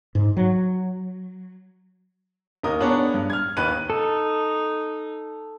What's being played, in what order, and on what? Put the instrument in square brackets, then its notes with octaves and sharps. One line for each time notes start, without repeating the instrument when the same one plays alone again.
[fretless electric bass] G#2
F#3
[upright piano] D#2 D#4 A#4 D#6
B3 D4 G#4 C#5 D5
G2
F6 G#6
D#2 D#4 B4 F#6 D#7
[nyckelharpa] D#4 [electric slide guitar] A4